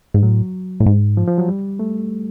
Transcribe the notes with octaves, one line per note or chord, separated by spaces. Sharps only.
G#2
A2 F#3
A2
G#2
F3
F3
F#3
G3
A3